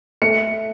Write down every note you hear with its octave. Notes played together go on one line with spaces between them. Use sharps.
A3 C#7